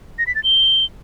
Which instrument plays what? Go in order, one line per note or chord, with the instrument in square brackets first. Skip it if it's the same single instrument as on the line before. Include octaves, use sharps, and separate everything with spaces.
[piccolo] A#6
B6
A6
G7